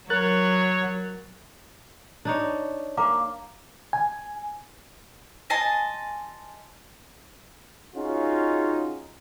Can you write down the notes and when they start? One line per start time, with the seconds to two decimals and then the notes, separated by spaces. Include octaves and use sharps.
0.10 F#3 A#4 C#5 F#6 A6
2.25 D4 D#4 C#5
2.97 A#3 F5 A#5 D6
3.93 G#5
5.50 D#5 G#5 A5 C6
7.96 C#4 D#4 F4 F#4 G#4